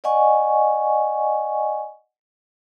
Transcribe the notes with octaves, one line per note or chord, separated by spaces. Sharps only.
D5 D#5 F#5 G#5 C#6